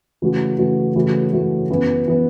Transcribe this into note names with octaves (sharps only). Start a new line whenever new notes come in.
C#3 E3 A3 F#4
C#3 E3 A3 F#4
C#3 E3 A3 C#4 F#4
C#3 E3 A3 C#4 F#4
F#2 E3 B3
E3 B3